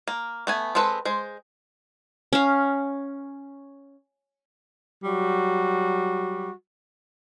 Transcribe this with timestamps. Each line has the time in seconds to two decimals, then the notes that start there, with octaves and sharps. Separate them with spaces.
0.08 A#3
0.47 A3 B3 G#5
0.75 G#3 C4 A4 B4
1.05 G#3 C5
2.33 C#4 F5
5.04 F#3 G3 F#4